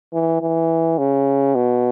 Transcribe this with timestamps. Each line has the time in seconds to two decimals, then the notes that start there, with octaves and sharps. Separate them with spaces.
0.13 E3
0.41 E3
0.98 C#3
1.55 B2